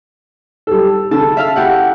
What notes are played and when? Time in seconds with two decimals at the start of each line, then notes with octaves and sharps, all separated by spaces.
0.67 G3 A4
1.11 C#3 A4 A5
1.37 E5 F5 A5
1.56 E4 G4 F#5